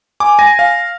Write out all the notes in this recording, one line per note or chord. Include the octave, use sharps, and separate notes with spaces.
G#5 D6
G#5 A#6
F5